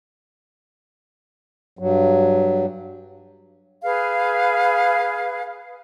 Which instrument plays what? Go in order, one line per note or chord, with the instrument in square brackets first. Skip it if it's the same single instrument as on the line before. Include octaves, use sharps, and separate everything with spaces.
[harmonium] G2 F#3
[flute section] G#4 B4 F5